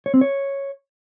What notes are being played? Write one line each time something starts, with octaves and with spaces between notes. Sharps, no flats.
C#5
C4
C#5